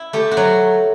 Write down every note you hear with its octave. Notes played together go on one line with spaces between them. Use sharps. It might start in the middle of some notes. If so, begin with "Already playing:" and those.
Already playing: E4
A3 G4
F#4
F#3